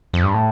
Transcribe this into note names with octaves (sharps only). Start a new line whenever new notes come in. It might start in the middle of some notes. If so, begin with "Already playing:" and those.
F2
G2
A2